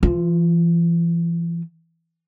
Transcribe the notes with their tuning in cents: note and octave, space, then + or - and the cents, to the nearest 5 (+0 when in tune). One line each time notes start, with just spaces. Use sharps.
E3 +40 F4 +0